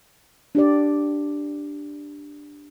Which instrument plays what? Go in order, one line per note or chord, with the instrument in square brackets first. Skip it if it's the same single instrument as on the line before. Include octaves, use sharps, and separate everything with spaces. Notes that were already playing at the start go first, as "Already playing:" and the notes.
[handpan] D4 G4 D5